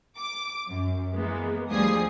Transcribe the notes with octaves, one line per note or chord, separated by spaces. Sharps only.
D6
F#2
E3 G#3 A#3 B3
D2 F3 G3 G#4 D#6 C7